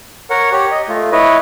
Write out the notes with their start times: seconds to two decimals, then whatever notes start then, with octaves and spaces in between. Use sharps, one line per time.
0.30 A#4 C#5 F#5
0.52 G4 C#5
0.71 D#5
0.89 A3 F4
1.12 E4 B4 C#5 D#5